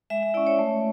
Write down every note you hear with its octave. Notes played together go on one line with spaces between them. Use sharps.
G#3 E5
E5
C#4 E4 D5
C#5
A3